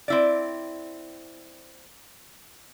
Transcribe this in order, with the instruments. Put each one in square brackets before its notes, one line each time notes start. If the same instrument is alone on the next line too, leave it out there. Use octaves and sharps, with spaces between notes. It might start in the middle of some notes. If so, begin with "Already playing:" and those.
[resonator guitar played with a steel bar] C4 E4 D5